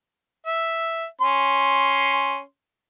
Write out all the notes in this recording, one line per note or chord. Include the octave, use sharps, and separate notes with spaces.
E5
C#4 C6